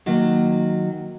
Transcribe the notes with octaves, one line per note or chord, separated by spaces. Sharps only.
D#3 F#3 A#3